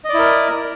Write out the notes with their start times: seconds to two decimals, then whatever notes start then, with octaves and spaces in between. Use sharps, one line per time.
0.05 D#5
0.09 D5
0.14 E4
0.19 A#4